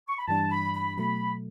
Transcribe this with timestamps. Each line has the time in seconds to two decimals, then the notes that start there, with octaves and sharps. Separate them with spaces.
0.09 C#6
0.18 B5
0.27 G2 E3 G3 D4 A5
0.51 B5
0.75 B5
0.98 B2 F#3 A3 B5